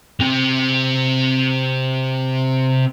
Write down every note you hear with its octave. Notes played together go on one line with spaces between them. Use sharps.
C3 C4